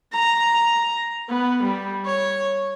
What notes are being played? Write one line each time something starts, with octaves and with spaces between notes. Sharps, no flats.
A#5
B3
G3
C#5